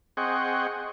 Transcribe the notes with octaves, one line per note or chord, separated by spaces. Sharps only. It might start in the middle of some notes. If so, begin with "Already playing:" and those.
C4 G#4 D#5 F#5 G5 C#6